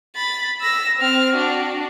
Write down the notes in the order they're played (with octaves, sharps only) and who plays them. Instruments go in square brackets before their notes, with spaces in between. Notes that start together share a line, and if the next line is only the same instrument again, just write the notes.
[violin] B5 A6
E6 A#6
C4 F6
D4 F#4